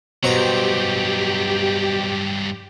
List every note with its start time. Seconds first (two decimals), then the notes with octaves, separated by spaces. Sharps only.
0.23 G2 B2 F#3 G4 C5 A#5